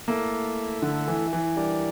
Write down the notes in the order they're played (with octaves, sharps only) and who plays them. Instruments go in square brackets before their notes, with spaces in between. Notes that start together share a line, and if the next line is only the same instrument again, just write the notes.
[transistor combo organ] A3 E4 A4 E5 [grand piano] A#3
[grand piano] D3
E3
E3
[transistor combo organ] G3 D4 G4 A#4 D5